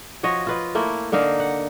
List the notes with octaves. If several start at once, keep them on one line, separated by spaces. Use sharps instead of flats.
F3 F#4 C#5 D#5
F4 B4 D#5
A3 A#3 E4
D3 A#3 D#4 F5
F#5